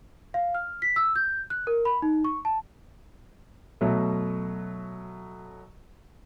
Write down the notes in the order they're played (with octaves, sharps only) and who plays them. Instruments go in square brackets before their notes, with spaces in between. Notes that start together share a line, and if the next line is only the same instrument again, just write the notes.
[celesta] F5
F6
B6
E6
G6
F#6
A#4
B5
D#4
C#6
A5
[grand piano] B2 F#3 A3